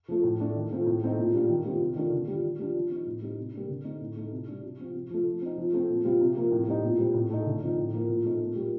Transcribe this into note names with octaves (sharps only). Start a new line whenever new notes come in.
F3 A3
A2
A3 D4
D#3
A3 C4 F4
A2
A3 C4 D#4
A#2
G3 D4 F4
D#3
G3 C4 F4
C3
D#3 A3 D4 F4
D3
G3 D4 F4
D#3
G3 D4 F4
F3
C4 D#4
A2
G3 C4 D#4
C3
G3 A#3 D4
D3
A3 C4 D#4
A2
A3 D#4
C3
G3 D4
C3
F3 C4 F4
C3
F3 A3
F3
C4 D#4
F3
A3 C4
A#2
G3 C4 F4
C3
F3 A#3 F4
A2
G3 C4 D#4
A#2
G3 C4
A2
A3 D#4
D3
F3 C4 D#4
A2
F3 A#3 F4
A#2
A3 C4 D#4
A#2
G3 A#3 F4